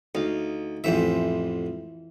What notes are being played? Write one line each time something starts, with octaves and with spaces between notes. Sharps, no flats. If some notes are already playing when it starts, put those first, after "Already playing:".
D2 D#4 F5
A1 F2 E3 C5 E5